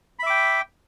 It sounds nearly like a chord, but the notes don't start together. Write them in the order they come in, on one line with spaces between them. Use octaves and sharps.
B5 E5 D6 G5